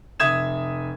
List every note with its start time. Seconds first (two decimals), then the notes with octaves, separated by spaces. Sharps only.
0.20 F1 E5 D#6 G#6 E7